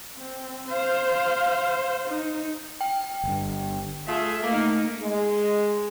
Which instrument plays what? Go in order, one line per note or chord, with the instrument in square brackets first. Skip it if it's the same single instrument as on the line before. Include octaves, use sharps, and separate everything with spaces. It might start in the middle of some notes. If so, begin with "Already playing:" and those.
[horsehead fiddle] C4
C5 F5
D#4
[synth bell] G5
[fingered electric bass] G1 G2
[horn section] A3 F4 G#4 [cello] E5
[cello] A3 D#4 [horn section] A#3
[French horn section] G#3